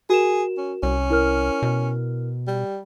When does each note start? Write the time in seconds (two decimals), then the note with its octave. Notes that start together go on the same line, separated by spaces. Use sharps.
0.10 F#4 G#4 A#4 E7
0.58 C#4
0.83 C2 C#4
1.10 E4 A#4 F6
1.62 B2
2.47 G3